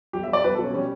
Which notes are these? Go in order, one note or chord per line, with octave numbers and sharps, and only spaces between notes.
B1 G4
E5
G3
D5
B1 B4
A4
B2
C#4
G3 C#4